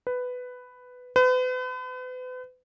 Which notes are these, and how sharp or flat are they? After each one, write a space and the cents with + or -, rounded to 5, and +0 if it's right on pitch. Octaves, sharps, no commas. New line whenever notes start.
B4 +10
B4 +40